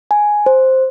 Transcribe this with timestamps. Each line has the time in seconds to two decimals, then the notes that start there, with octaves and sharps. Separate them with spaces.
0.11 G#5
0.46 C5